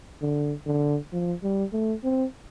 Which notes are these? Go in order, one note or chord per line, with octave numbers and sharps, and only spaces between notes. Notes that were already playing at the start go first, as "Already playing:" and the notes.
D3
D3
F3
G3
A3
C4